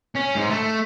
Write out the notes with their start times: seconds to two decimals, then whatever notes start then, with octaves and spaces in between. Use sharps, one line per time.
0.15 C#4
0.35 G#2
0.50 A3